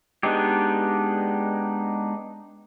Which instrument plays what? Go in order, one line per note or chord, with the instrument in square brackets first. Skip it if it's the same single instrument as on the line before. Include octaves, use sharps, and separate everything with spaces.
[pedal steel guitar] G#3 B3 D4 D#4 G4